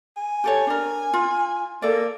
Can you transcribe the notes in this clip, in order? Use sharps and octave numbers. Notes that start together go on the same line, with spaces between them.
G#5
G4 A4 C#5
D4 A#4
F4
A#3 A4 D5